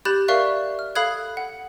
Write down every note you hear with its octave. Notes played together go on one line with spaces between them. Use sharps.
G4 B5 F#6 G6 A6 E7
A#4 D5 E5 F5 C#6 F#6
F6
A4 F5 B5 D#6 F#6 G#6
F#5